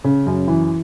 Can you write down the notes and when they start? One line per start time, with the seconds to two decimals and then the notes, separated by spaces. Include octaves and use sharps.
0.04 C#3
0.26 F#2
0.48 E3